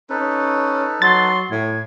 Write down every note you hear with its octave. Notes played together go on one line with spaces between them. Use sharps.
C#4 D#4 A4 B4
F#3 C6 A6
A2 G#6